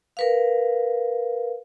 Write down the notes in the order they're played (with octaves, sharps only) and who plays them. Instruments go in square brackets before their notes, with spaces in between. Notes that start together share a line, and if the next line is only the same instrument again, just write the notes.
[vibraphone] A#4 B4 F5